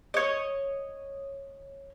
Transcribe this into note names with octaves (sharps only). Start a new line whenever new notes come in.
C#5 D#5